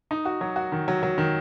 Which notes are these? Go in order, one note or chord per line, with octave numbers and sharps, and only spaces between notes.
D#4
F#4
F#3
F#4
D#3
F#3
F#3
D#3